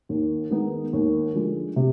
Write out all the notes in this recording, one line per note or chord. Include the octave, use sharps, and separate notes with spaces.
D#2
D#3 G#3 B3 D#4
D#2
D3 F3 G#3
C3